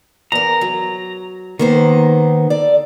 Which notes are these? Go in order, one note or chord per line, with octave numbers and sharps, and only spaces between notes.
E2 A#4 A#5
F#3
D#3 A#3 B3 C5
A4 D5